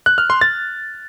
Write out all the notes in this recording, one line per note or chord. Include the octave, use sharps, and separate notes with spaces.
F#6
F6
C6
A6